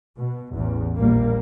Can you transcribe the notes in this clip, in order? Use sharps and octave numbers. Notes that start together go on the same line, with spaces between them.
B2
A1 E2
A#1 G3 A#3